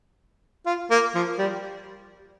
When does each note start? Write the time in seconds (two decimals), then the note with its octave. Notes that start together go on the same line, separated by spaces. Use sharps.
0.66 F4
0.91 A#3
1.15 F3
1.38 G3